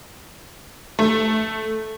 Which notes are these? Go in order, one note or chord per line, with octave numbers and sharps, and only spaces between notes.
A3